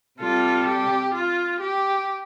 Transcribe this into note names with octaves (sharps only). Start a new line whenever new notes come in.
C3 G3 F4 A4
G4
F4
G4